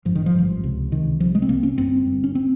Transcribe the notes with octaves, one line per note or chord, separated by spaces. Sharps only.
G#1 G2 F3
D#3
F3
G#1 G2
C#2 C3
C#2 C3 D#3
C2 C3 F3
G#3
C4
C2 C3 A#3
C#4
G1 G2 C4
G1 G2
C#4
C4